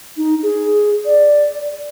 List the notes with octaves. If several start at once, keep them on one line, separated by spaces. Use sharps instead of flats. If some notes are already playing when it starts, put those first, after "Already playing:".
D#4
G#4
D5